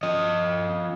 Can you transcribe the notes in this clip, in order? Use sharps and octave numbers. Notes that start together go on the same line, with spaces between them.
F3 D#5